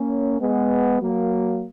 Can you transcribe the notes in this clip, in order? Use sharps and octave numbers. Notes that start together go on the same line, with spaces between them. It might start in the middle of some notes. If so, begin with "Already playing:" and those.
Already playing: A#3 C#4
G#3 B3
F#3 A#3